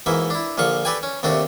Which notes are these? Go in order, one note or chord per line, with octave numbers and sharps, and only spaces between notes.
G#2 B2 E3 A#3 E5
D4 E4
A#1 A#2 D3 F3 F5 C#6
G4 A4 B4 D5 G5 G#5
C#4
D#2 C3 A3 D4 F#4